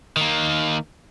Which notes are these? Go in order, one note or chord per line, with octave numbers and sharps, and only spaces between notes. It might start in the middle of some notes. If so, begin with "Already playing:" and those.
D#3 A#3